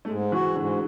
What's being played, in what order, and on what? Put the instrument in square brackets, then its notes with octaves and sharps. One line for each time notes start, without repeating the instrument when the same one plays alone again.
[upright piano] A3
[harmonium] G#2 [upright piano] G#3
[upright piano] E3 [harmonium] F#4
[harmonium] G#2 [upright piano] D3